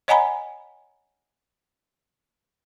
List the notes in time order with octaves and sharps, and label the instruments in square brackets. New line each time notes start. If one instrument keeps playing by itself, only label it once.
[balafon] C#5 D#5 F#5 G#5 A#5 B5